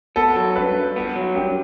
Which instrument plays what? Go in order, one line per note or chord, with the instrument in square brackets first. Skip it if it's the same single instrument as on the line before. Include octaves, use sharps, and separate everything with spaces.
[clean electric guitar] B3 [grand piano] A4
[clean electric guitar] F#3
[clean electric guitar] G2 [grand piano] B4
[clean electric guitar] G2
B3
F#3
[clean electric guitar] G2 [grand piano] G4